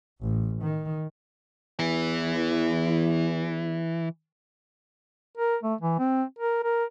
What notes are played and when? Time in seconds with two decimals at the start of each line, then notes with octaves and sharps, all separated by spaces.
0.21 A1
0.62 D#3
1.79 E2 E3
5.37 A#4
5.63 A3
5.81 E3
5.99 C4
6.39 A#4
6.64 A#4